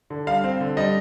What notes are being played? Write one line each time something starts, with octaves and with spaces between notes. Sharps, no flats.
D3
G3 F5
C4
D3
G3 D#5